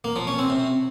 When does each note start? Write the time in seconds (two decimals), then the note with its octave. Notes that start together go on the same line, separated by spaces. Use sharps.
0.04 A#3
0.16 F3
0.27 C#4
0.39 C4
0.50 C3